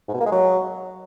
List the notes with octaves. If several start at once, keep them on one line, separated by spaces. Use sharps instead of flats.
G#2
B2
A#3
G#3
F#3